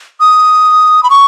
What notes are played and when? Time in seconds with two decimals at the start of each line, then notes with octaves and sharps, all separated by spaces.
0.20 D#6
1.03 B5
1.10 C#6